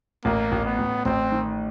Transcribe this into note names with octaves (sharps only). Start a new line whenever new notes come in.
A1 A#3
A1
B3
A1
A1 C4
D#3